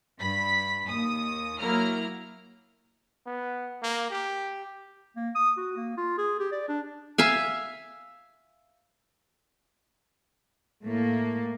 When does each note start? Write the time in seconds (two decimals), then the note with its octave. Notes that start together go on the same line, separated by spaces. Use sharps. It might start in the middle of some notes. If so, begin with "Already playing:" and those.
0.18 G2 B5 B6
0.87 D#2 D#6
1.59 F#3 A#3 E4 A#5 F6
3.26 B3
3.82 A#3
4.11 G4
5.16 A#3
5.35 D#6
5.57 F#4
5.76 A#3
5.97 F4
6.18 G#4
6.39 G4
6.52 D5
6.69 D4
7.18 E5 F5 G#5
10.84 A2 A3 A#3